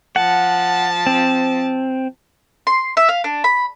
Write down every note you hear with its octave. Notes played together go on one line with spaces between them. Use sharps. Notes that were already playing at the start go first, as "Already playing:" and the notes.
F3 F#5 A5
C4
C6
E5
F5
D4
B5